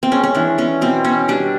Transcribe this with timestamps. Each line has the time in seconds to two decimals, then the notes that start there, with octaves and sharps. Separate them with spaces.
0.03 C4
0.11 G#3 C#4
0.24 C#4
0.35 E3 D4
0.58 B3 C#4
0.81 B2 C4
1.04 B2 C#4
1.28 G3 D4